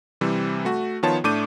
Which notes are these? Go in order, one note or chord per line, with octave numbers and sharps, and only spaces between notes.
C3 E3 G3 C4
A3 F#4
D#3 F3 B3 F4 C#5 A5
A2 A3 D4 D6 G6 D#7